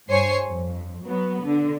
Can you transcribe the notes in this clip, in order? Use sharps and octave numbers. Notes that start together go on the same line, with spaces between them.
G2 C5 C#5 G#5 C#6 C7
F2
F#3 B3
D3